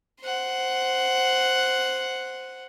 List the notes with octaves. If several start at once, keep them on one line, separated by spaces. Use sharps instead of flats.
C5 F#5